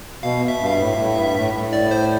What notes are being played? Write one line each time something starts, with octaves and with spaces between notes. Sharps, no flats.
B2 F5
E5
G2
F5
E5
A2
A2
G2
A2
A2
D5
C5